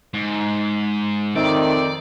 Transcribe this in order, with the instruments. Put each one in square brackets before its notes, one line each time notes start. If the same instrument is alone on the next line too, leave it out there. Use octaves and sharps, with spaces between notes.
[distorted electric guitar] G#2
[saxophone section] F2 A3 C4 [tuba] D#3 [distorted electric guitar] D5